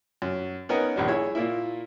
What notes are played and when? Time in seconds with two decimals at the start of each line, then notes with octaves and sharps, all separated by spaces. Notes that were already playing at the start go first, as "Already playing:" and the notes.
0.22 F#2
0.69 B3 C#4 D#4 A#4 F#5
0.96 A#1 D#2 G3
1.08 E4 G#4 C#5
1.35 A#2 A#3 E4